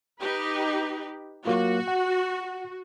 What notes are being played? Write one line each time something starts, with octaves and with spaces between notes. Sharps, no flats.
D#4 G4 B4
F#3 A#3 F4 F#4
F#5